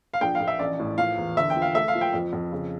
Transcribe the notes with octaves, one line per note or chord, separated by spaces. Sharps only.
F5
A#1 G5
F5
A#1
E5
A1 D5
A2
F3 F5
E2
D3 E5
G5
F3
F5
A3 E5
F5
F3
G5
F2
F2
C#3